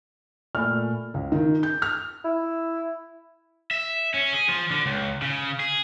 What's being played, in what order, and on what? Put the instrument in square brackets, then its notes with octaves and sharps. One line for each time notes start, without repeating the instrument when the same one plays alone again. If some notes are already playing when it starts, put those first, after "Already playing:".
[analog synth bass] A#2 [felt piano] A3 [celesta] D5 G#5 B5 [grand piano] F6
[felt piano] C#2
D#3
G6
F6
[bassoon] E4
[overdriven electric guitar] E5
C#4
G#4
F3
D3
C#2
C#3
G#4